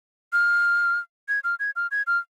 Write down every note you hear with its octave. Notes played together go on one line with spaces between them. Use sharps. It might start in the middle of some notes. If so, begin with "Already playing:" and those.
F6
G#6
F6
G#6
F6
G#6
F6